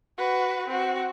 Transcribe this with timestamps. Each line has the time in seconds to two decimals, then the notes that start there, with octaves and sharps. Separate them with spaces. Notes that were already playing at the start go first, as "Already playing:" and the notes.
0.18 F#4 B4
0.69 C4 F#4